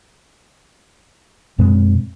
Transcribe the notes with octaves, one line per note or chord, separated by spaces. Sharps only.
F#2 B2 G#3 C4